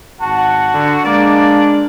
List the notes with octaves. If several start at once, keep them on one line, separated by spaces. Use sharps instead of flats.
G#1 F#4 F#5 A5
D3
G#3 A#3 D4 D5